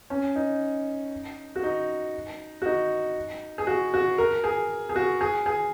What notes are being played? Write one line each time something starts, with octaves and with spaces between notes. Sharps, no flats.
C#4
D#4
F#4
D#4
F#4
D#4
G#4
F#4
F#4
A#4
G#4
G#4
F#4
G#4
G#4